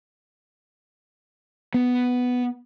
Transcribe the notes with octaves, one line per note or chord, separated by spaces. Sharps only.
B3